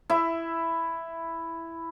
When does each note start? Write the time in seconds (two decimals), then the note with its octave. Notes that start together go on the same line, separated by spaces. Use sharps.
0.10 E4 E5